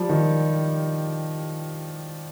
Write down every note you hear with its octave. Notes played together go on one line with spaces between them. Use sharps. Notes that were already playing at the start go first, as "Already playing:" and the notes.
Already playing: F3 G3
D#3